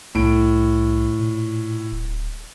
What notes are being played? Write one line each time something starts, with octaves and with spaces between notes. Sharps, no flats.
C2 A2 D7
A#2
D1